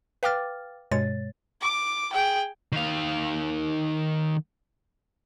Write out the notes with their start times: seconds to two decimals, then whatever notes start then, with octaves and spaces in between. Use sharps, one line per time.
0.23 B4 F5 G5 D6 F6 A6
0.91 G2 B2 G#3 C#5 A6
1.61 D6
2.13 G#4 G5
2.72 D#3 F5